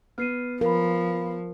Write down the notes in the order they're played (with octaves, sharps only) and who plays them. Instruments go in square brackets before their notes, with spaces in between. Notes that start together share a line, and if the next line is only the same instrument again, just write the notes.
[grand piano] B3 [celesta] F6 C7 D#7
[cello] F3 [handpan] A#4 [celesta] F5 B5